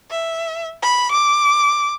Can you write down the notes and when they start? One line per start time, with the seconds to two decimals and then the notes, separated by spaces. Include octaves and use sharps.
0.11 E5
0.83 B5
1.12 D6